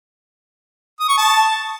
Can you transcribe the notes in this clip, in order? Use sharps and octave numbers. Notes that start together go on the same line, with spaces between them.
D#6
C#6
A5